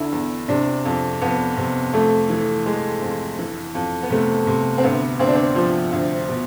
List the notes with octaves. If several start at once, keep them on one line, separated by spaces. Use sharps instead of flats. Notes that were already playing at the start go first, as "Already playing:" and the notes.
Already playing: E2 D3 E4
E2
C3 D4
F2
F2 B3
C3
F2 A3
E3
E3 G#3
F2
E3
F2
B3
C3 A3
C3
C4
D2 B3
D2 C4
D4
C4
F3
D2
B2